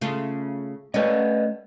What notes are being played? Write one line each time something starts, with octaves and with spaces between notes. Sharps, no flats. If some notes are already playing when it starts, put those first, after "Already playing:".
C#3 A3 F4
A3 C#4 B4 D5 D#5